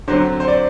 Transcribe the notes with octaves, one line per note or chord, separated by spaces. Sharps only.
D3 F#3 C4 C5
C5
D5